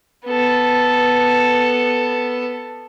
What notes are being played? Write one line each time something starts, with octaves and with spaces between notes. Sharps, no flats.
B3 A4